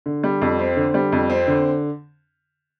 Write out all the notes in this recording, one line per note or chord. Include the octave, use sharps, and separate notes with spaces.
D3
G3
F2
C4
D3
G3
F2
C4
D3